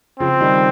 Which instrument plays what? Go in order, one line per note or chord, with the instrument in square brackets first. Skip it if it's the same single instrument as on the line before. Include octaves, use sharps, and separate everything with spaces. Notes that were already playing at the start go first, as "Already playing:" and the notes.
[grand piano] C#3 F3 [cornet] C4
[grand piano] D#3 G3